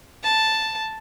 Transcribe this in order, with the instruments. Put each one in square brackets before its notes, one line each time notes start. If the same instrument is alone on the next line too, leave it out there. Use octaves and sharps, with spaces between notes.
[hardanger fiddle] A5